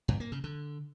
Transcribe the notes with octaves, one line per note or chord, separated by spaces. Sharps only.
G2
A#3
C#3
D3